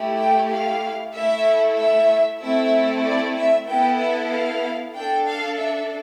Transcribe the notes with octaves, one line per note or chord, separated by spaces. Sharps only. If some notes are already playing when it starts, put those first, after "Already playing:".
Already playing: A3 E4 G4
G5
F5
A3 E4 A4 E5
E5
A3 C4 E4 A4 E5
D5
E5
B3 E4 A4 G5
E5
F5
D4 A4 G5
F5
E5